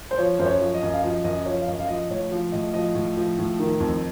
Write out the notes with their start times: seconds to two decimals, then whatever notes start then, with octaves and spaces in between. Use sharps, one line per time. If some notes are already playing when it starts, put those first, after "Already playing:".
0.11 C5
0.18 F3 C#5
0.39 F#2 C5
0.46 C#5
0.61 F3
0.74 D#5
0.82 F#2
0.93 F5
1.03 F3 D#5
1.24 F#2 D#5
1.46 F3 C#5
1.62 F5
1.67 F#2 D#5
1.80 F5
1.88 F3 D#5
2.10 A2 C#5
2.32 F3
2.52 A2 D#5
2.74 F3 D#5
2.95 A2
3.17 F3
3.38 A2
3.59 D#3
3.80 F2